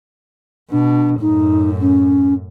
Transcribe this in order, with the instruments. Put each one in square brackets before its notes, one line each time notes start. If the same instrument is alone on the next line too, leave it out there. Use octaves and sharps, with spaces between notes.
[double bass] B2 [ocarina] D4
[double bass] F#2 A2 [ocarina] D#4
[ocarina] C#4